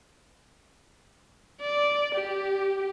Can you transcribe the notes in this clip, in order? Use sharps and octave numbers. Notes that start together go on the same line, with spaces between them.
D5
G4